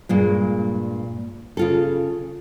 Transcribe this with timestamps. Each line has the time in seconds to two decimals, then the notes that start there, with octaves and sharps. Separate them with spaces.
0.09 G2 A#2 G#3
1.57 C#3 F4 A4